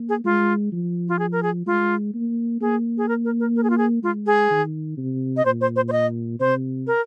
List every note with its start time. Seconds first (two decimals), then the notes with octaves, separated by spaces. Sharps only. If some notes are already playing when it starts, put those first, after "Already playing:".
Already playing: A#3
0.09 G#4
0.25 G#3 F4
0.72 F3
1.09 F4
1.19 G#4
1.32 A#4
1.43 G#4
1.66 G#3 F4
2.14 A#3
2.61 A#3 G#4
2.98 G#4
3.08 A#4
3.25 A#4
3.40 A#4
3.56 A#4
3.63 G#4
3.70 F4
3.78 G#4
4.03 G#3 F4
4.26 G#4
4.50 D#3
4.97 C3
5.37 D#5
5.45 A#2 C5
5.61 C5
5.76 C5
5.88 C5
5.92 D#5
6.40 C3 C5
6.87 A#4